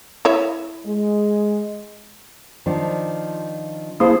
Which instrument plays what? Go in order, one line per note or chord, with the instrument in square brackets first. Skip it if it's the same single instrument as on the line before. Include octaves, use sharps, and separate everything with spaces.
[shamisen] E4 C#5 E5
[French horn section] G#3
[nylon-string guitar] D#3 F3 D4
[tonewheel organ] A#3 E4 G#4 [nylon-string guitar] A4 C5